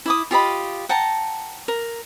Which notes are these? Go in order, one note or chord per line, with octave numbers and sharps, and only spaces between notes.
E4 D6 D#6
F4 G4 D#5 B5
F#5 G5 A5 A#5
A#4